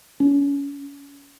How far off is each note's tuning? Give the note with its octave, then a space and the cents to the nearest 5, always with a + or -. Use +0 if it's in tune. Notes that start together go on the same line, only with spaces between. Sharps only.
C#4 +30